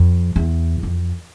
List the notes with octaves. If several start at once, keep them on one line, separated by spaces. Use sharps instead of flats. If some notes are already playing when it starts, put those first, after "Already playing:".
Already playing: F2
E2
F2